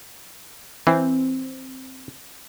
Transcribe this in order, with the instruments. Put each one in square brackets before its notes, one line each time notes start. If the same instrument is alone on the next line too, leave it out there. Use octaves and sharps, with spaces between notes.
[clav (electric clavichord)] E3 [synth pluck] C4